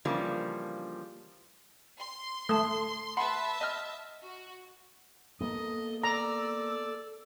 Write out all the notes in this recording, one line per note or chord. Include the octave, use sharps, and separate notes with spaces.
C#3 E3 F3 G3 A#3 D4
C6
A3 A5 D#6
B4 E5 F#5 A5 B5 C6
D#5 F6
F#4
A#3 B3 A4 D#5
A4 D5 A#5 E6